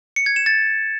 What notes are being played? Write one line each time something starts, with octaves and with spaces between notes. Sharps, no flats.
C#7
G#6
E7
A6